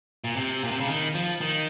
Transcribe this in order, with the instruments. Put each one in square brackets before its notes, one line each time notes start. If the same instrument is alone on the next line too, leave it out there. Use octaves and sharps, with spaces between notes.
[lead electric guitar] A#2
C3
A#2
C3
C#3
D#3
F3
D#3